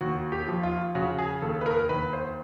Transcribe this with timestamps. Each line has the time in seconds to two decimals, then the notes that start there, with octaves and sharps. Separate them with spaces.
0.01 D#2 F#4
0.32 G4
0.48 F3
0.63 F4
0.95 C#3 F#4
1.19 G#4
1.42 D#2 A4
1.61 B4
1.66 A#4
1.89 D#2 B4
2.13 C5